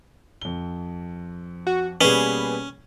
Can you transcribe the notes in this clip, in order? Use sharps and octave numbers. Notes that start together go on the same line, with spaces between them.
F2 G7
F#4
B2 G3 A#3 C#4 G#4 B4